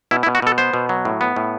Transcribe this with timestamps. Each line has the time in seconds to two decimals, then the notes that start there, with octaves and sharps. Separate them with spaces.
0.11 B2 E4
0.23 E4
0.27 B2
0.35 F#4
0.42 B2 A4
0.58 B3 C5
0.74 B2
0.89 F#3
1.05 A2
1.21 B3
1.36 A2